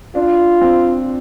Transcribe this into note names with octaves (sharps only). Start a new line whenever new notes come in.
D4 F4
C4